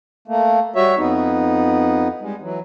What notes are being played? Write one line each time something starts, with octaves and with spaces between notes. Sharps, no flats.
A3 A#3
G3 F#4 C#5 E5
F2 B3 D#4
G3 G#3
E3 F#3